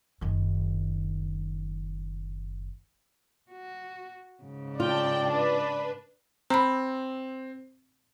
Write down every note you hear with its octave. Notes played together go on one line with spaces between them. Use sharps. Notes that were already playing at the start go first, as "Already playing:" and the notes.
F#1 D#3
F#4
G#2 C#3
F4 D5 G5 A5
D4 B4
C4 A#5 B5